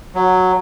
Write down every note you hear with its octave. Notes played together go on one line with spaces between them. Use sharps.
F#3